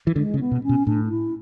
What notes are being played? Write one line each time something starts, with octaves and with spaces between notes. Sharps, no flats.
E3
D3 G#3
C#3
B3
B2
C#4
B2
A2 D4
D4
E4